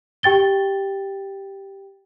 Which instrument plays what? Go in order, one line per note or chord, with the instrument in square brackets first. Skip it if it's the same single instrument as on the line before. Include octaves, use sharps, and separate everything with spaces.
[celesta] G4 G5 A6 G7